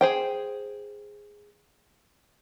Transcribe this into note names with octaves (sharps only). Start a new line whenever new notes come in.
G#4 C5 G5